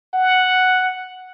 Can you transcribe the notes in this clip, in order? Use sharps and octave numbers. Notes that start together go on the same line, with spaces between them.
F#5